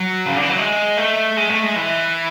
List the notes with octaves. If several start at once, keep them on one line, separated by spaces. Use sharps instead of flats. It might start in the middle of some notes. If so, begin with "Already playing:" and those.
Already playing: F#3
C#3
D3
E3
F#3
G#3
A3
G#3
A3
G#3
E3